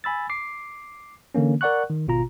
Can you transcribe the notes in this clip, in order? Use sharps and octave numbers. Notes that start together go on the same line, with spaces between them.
G#5 B5 E6 A6
D6 C7
D3 E3 A#3 C#4
A#4 D5 F#5 C#6 F#6
D#3
G#1 B2 F4 A#5